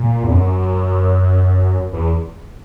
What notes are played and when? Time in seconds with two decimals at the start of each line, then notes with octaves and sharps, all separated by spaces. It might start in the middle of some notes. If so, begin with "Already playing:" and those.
Already playing: A#2
0.24 E2
0.31 F#2
1.93 E2